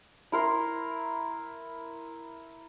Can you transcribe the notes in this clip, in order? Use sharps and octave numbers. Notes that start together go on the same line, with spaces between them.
E4 A#4 C6